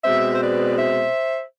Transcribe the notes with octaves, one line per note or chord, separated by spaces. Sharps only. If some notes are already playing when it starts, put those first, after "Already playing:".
B2 G#3 C4 C5 E5
C5
B4 D5
C5 E5